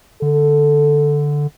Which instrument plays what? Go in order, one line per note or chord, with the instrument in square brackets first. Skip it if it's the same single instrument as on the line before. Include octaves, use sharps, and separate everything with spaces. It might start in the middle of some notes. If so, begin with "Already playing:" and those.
[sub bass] D3 [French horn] A4